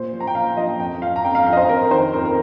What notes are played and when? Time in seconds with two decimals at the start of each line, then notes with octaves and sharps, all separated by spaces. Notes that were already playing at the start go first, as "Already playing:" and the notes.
Already playing: A#2 C5
0.13 F3
0.20 A#5
0.27 G5
0.35 A#2 F5
0.57 F3 D#5
0.79 F2 G5
1.02 F3 F5
1.16 A#5
1.24 F2 G5
1.35 F5
1.46 F3 F5
1.53 D#5
1.57 C5
1.69 F2 A#4
1.91 D#3 C5
2.13 F2 A#4
2.25 A#4